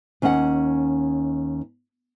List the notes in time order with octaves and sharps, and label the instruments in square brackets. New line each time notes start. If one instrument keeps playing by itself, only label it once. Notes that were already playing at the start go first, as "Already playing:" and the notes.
[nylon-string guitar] D#2 C#4 D#5 E5 F#5